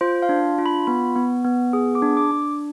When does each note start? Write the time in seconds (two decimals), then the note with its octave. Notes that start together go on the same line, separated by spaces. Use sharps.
0.01 F4 C5
0.22 F5
0.29 D4
0.59 F4
0.66 B5
0.87 B3 B5
1.16 B3
1.44 B3
1.73 G#4
1.95 D6
2.02 D4
2.17 D6
2.31 D4